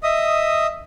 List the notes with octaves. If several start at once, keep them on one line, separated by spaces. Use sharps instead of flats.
D#5 E5 D#6